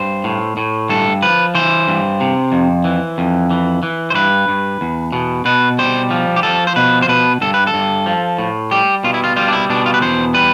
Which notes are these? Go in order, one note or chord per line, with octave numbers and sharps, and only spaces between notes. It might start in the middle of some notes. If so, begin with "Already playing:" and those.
Already playing: G2 C5
A2
A2
G2 A4
F3 B4
E3 C5
G2
C3
F2
E3
F2
E3
E3
C5
G2 B4
G2
E2
B2
B2 B4
G3 C5
F3
G4
F3 A4
C5
B2 B4
C5
B2 B4
G2 A4
B4
A4
G2
F3
A2
G3 G4
B2 F4
E4
F4
G3 F4
D4
E4
B2 D4
F4
B4
E2 C5
G3 B4